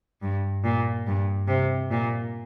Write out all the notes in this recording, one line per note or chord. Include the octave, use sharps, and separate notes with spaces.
G2
A#2
G2
C3
A#2